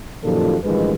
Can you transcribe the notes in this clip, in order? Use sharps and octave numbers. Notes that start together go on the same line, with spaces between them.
F#2 A#2 D#3 F3 G4 A4
A1 G2 D#3 F3 G#3 B4